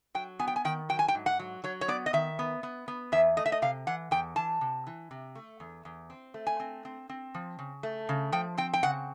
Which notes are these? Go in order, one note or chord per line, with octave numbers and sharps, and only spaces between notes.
F#3 G5
B3 G#5
G5
G#5
D#3 G5
F#3 G5
G#5
G5
G#2
F#5
F#3
F#3 C#5
C#5
B3 D5
D#5
D#3 E5
B3
B3
B3
E2 E5
A3 D#5
E5
D#5
C3 F5
E3 F#5
E2 G5
E3 A5
C3
E3
C3
A3
E2
E2
C4
A3
G#5
C4
C4
C4
F3
C#3
A3
C#3
F3 G5
C4 G5
G5
C#3 F#5